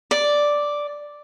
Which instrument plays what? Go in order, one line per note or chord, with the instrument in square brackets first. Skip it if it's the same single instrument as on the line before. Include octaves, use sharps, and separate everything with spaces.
[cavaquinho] D5